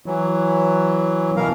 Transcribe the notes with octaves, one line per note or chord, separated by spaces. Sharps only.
E3 F#3
B2 E3 A#4 F5